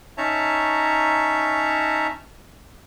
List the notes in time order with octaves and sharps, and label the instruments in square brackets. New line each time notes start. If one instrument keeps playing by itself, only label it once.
[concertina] C#4 D#4 C#5 E5 A5 A#5